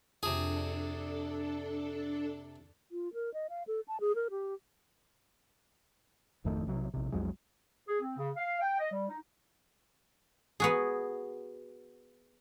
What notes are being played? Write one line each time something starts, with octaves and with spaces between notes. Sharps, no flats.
F2 C3 D4 G#4 A4
F4
A#4
D#5
F5
A4
A5
G#4
A#4
G4
G#1 F2 D#3 A3
B1 C3 F#3
A#1 C3
B1 F2 F#3 G#3
G#4
C4
C#3
F5
G5
D#5
G3
D#4
B3 F#4 G#4